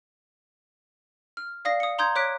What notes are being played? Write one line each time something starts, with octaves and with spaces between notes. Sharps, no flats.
F6
D5 F5 D#6 A#6 C7
D#6 C#7
A#5 C6 D#6 G6 G#6
C#5 D6 F#6 B6 D7